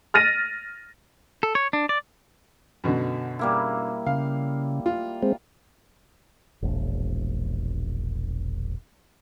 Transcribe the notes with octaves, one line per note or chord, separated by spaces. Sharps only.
F6 A6 A#6 D#7
A4
C#5
D4
D5
F#2 B2 D3
G3 A#3 E4
C#3 F5
F4
G#3 C4
E1 A#1